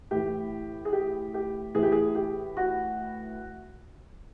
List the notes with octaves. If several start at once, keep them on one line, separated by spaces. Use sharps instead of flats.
A2 E3 G4
G#4
G4
G4
A2 E3 G#4
G4
G#4
G4
F#4